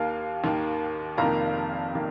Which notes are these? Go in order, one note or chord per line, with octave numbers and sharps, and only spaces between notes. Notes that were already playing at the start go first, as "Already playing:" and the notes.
Already playing: D#2 D#3 A#3 F5
D#2 D#3 A#3
F1 F2 D#3 A#3 F5 A#5
D#3 A#3